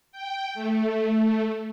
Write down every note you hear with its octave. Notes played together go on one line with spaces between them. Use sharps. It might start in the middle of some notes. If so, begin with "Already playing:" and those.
G5
A3